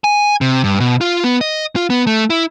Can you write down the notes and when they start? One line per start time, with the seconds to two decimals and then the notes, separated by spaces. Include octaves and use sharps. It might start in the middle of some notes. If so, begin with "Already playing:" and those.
0.04 G#5
0.41 C3
0.64 G2
0.80 B2
1.01 F4
1.24 B3
1.41 D#5
1.76 F4
1.90 B3
2.07 A3
2.30 E4